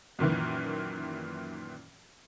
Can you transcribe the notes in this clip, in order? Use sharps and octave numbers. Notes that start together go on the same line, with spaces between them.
F#2 A#2 D#3 E3